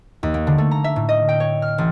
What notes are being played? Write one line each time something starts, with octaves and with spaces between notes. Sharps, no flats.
D#2
A#3
D3
A3
A#5
E5
A2
D#5
G5
C#5
F6
A1